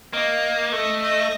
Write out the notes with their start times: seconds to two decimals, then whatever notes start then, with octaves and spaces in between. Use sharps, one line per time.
0.13 A#3 D#5
0.72 A3 D#5
1.02 D#5